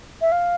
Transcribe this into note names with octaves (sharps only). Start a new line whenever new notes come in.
E5
F5